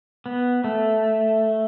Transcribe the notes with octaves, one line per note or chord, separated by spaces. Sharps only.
B3
A3